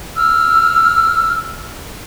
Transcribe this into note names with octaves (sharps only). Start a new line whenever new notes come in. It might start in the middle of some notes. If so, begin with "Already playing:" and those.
E6 F6